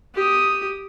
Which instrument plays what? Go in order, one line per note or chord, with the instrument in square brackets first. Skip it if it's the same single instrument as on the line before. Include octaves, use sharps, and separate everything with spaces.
[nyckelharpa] G4 D#6